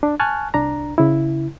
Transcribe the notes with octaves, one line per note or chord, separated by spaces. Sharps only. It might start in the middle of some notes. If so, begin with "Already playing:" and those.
D4
G#5 A5 C#6 F6 F#6
C2 D4 A#5
C#3 E4